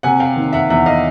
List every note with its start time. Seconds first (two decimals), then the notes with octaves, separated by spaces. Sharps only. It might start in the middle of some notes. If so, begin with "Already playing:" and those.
0.03 C3 F#5 G#5
0.20 F5 G5
0.36 D#3
0.53 E5 F#5
0.70 E2 E5 F#5
0.86 D#5 F5